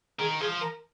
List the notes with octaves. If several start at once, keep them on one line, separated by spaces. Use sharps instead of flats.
D#3 G#4
F3 G#4
A#4